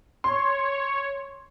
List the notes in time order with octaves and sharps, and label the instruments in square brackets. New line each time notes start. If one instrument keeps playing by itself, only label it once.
[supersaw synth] C#5 [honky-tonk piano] C6